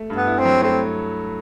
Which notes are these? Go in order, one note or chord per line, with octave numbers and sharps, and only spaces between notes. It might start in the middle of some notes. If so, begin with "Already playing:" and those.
Already playing: A3
G2
B3
E4
C4
F#3
A3 C4